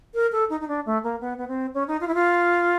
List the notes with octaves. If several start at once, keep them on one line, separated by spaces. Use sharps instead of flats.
A#4
A4
D#4
D#4
D4
A3
A#3
B3
B3
C4
C#4
D#4
F4
E4
F4